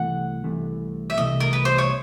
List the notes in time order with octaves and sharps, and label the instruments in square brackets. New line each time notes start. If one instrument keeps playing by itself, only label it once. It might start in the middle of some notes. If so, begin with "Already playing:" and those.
Already playing: [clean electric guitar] C2 C3 E3 A3 [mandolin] F#5
[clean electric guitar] C2 C3 E3 A3
[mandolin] E5
[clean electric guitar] C2 C3 E3 A3 [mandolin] D#5
[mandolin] A#4
B4
C5
C#5